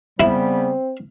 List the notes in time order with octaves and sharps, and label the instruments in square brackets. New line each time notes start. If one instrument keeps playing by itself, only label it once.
[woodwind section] C#3 G3 B3 [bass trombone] C4 [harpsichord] E4